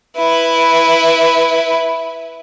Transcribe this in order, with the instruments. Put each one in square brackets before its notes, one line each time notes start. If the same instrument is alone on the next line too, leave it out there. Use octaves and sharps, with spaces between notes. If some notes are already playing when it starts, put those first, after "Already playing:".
[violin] E4 B4